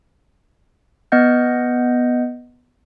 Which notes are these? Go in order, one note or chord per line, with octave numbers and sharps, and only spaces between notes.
B3 D#5 F#5 G6